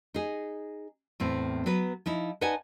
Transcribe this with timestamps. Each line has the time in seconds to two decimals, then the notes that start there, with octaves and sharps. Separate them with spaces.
0.14 D#4 G#4
1.20 E2 A2 C4
1.66 F#3 B3 B4
2.06 F3 D#4 E4
2.41 D#4 B4 D5 F#5 G#5 A5